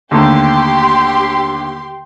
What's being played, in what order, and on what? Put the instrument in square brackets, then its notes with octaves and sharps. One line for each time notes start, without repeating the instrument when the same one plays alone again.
[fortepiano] D#2 D3 A3 [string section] G4 C6